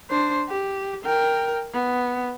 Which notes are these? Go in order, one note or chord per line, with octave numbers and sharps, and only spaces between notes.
D4 C5
G4
A#4 G5
B3